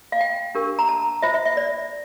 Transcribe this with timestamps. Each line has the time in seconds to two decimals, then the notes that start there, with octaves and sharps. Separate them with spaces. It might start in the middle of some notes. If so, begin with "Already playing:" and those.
0.12 F5
0.21 G5
0.55 D4 G4 A#4
0.79 A#5
0.89 A5
1.22 F4 C5 E5
1.34 E5
1.45 E5
1.57 D5